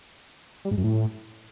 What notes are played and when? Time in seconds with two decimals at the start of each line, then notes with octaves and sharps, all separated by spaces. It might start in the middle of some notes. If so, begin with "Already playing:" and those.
0.65 G3
0.71 G#2
0.77 F#2
0.84 A2